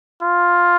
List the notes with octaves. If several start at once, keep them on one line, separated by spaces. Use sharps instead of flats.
F4